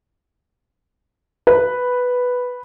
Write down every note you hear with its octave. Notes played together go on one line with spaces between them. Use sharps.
B4